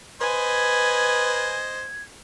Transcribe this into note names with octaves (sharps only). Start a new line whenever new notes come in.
B4 C5 D#5 G#5 G#6